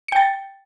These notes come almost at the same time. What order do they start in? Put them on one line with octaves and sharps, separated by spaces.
C#7 G5 A6